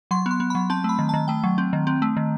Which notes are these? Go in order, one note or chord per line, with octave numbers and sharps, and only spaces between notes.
F#3 C6
B3 C6
B3
F#3 B5
C4 A5
A3 B5
D#3
D#3 A5
A3 G5
F#3
C4
D#3
C4
A3
D#3